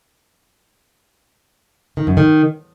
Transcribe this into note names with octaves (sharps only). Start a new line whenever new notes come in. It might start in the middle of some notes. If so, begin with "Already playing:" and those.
D#3
F#2
D#3